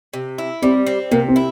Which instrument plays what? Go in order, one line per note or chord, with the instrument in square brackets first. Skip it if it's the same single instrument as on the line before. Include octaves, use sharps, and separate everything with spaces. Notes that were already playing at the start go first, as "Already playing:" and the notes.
[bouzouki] C3
E4
[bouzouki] G3 [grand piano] C4
[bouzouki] C4
[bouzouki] C3 [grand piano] A#3
[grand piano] C4
[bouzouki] E4